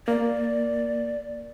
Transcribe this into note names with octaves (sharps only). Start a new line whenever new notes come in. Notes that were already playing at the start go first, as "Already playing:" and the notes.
A#3 D5